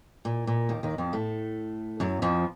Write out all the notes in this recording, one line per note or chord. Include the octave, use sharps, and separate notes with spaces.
A#2
A#2
D#2 D#3
D#2 D#3
F2 F3
A2 A3
F#2 F#3
F2 F3